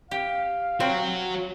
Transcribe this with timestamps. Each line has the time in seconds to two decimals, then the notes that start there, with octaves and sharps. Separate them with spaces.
0.11 G4 F5
0.80 C4 F#4 C#5